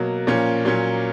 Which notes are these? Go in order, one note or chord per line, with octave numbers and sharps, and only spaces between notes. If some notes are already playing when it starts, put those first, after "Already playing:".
Already playing: B2 F#3 A#3
A#2 F3 A#3 C#4
A#2 F#3 A#3 C#4